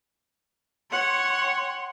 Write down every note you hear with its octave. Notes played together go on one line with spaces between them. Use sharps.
C#5 F#5 G5 C6